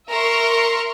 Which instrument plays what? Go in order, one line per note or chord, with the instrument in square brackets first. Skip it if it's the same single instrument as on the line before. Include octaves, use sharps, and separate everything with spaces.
[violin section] A#4 E5 C6 C#6 F6